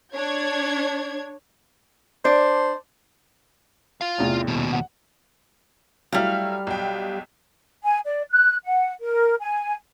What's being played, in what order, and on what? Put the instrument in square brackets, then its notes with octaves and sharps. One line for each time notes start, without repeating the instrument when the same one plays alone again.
[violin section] D4 C#5 G#6
[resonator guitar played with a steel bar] D4 D5 [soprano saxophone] C5
[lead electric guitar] F4 F5
[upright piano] A1 E2 C3
[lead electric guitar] D#2 B2
[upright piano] F#5
[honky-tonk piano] F#3 A3 E4 [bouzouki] G3 F5
[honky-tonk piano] B1 G5
[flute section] G#5
D5
F#6
F#5
A#4
G#5